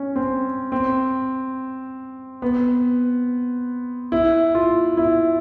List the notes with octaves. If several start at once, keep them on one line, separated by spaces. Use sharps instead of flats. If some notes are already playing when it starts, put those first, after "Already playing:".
Already playing: C#4
C4
C4
B3
E4
F4
E4